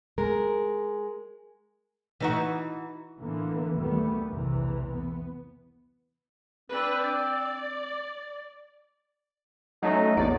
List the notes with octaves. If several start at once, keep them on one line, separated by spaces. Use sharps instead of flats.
G#3 A#4
E3 D#4 F#4
A2 D3 E3 A#3 B3
D2 D#3 G3 A3 B3
B1 E2 C3 E3
B3
C4 D4 B4
D5
F#3 A3 C#4 D#4
A#1 E2 F#3 D5